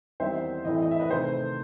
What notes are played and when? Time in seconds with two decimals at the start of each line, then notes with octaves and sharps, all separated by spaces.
0.20 E2 D#3 G3 C4 D#4 C5 E5
0.65 A2 E3 A3 C4 D#5
0.74 E5
0.82 D#5
0.91 E5
1.00 B4 D#5
1.10 C3 D#3 A3 C5